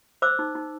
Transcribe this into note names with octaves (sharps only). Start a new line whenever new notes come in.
C5 D6 E6
D#4
D#4